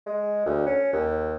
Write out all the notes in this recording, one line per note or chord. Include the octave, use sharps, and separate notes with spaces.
G#3
D2
C#4
D#2